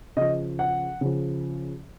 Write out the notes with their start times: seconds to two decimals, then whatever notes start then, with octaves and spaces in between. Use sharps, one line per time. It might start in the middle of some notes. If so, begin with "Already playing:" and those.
0.17 C#3 F3 D#5
0.59 F#5
1.01 C#3 F3